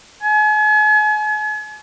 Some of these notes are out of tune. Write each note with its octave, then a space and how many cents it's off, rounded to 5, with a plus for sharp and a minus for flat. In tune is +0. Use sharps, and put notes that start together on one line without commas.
G#5 +40